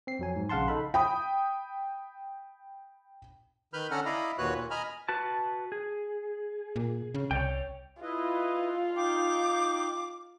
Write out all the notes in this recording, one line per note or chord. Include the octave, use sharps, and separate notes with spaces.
C4 C7
F2 F#3 G#5
G#2
A#1 C#3 F5 F#5 A5 C6
D#4 A4 B5
G5 B5 D#6
D#3 B4 B5 F6 G6
D3 C#4 A4 F#5 A#5 F6
E4 D5 D#5 F5 A#5 B5
D#2 A#2 F#4 B4 C#5 F#6
A#2
D#5 G#5 A#5 B5 F6
F#4 B4 A5
G#4
A#2
C#3
C2 C#5 D5 G5
E4 F4 B4 D#5
D#4 F5 G5 D6